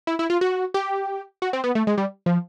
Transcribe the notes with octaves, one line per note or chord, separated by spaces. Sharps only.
E4
E4
F4
F#4
G4
F#4
C4
B3
A3
G#3
G3
F3